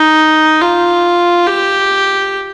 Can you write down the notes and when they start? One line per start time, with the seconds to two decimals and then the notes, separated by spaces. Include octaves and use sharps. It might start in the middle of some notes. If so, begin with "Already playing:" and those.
Already playing: D#4
0.61 F4
1.47 G4